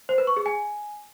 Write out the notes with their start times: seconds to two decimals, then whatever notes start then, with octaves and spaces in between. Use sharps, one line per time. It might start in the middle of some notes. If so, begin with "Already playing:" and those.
0.09 C5
0.18 B4
0.27 C#6
0.37 G#4
0.46 G#5